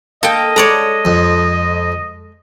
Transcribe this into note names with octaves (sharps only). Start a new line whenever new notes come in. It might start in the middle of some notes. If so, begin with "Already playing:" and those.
A#3 A4 D#5 G5
G#3 A4 C#5 D5 A#5
F2